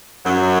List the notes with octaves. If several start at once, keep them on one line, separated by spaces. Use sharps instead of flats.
F#2 F#3